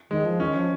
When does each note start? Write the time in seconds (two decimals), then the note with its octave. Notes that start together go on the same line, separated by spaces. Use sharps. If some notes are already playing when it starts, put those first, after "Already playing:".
0.10 D#3 G#3
0.25 F3
0.40 D#3 C#4
0.56 F3